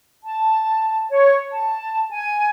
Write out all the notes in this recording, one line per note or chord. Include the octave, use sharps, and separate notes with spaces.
A5
C#5
A5
G#5